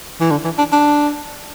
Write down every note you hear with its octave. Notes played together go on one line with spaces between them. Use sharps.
E3
D3
E3
D4
D4